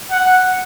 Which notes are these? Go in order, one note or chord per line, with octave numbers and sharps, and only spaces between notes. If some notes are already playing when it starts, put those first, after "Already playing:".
F#5